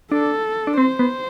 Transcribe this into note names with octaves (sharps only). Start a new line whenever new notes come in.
D4 A4
D4
C4 C5
B3